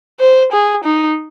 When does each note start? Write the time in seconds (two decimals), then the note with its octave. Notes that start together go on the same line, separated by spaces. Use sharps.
0.20 C5
0.52 G#4
0.84 D#4